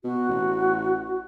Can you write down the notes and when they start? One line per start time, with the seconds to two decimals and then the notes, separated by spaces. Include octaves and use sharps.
0.04 B2 F#4
0.29 A1